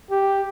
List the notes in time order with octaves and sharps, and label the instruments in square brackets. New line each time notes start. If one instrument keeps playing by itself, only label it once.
[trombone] G4